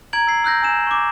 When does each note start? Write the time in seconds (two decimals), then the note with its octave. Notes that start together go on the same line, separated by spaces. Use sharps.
0.13 A#5 G#6 D7 F#7
0.27 E6 C7
0.44 E6 F#6 G6 A#6
0.62 G#5 E6 E7
0.87 C#6 D6